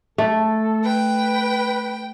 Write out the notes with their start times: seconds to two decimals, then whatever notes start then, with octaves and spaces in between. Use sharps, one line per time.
0.18 A3 A4
0.85 B4 G5